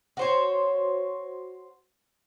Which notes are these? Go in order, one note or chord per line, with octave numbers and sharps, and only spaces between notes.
F#4 C5 C#5